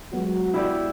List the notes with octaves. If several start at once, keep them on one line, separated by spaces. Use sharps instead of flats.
F#3 G#3 B3 F#4
E4 G4 D5